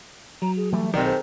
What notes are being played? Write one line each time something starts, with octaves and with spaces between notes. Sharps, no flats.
F#3 A#5
G#4
E3 G3 A3
B1 C3 D#3 D5
G#4 A4 C5